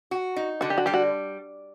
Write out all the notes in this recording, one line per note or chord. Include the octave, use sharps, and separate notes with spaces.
F#4
D#4
D3 F#4
G4
F#4
G3 G4
F#4